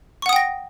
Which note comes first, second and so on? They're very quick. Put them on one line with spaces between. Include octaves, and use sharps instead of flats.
C#6 F#5 D#6 G5 A#6